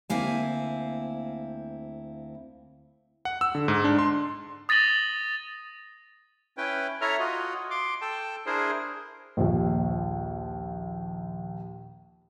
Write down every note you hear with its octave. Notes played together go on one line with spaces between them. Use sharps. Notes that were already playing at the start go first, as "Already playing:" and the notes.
D2 A#3 C4 E4 F5 G#5
F#5
E6
D3
G#2
D4
C6
D#6 A6 A#6 D#7 F#7 G7
C#4 E4 B4 G5
E4 A4 C#5 E5 A#5 F6
F4 F#4 D#5
C6 D6
A4 G5 A5
D4 E4 G#4 A#4 C5
A#1 D#2